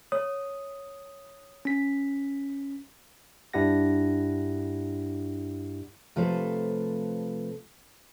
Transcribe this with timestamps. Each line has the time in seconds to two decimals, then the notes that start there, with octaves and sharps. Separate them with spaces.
0.12 C#5 D#6
1.65 C#4 B6
3.53 G2 D4 E4 G4 F#5 A#6
6.16 C3 F3 A3 A4 B4 C5